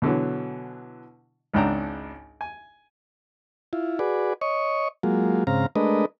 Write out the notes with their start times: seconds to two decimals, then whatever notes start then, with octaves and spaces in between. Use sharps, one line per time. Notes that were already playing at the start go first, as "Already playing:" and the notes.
0.02 B2 D3 E3 F#3
1.54 G#1 C#2 G#2 D4 G5 A#5
2.41 G#5
3.73 E4 F4
3.99 F#4 G#4 B4 D5
4.41 C#5 D#5 C#6
5.03 F#3 G#3 A#3 F4
5.47 G#2 C#3 C4 F5 A#5
5.76 G#3 A3 D4 A#4 B4 D#5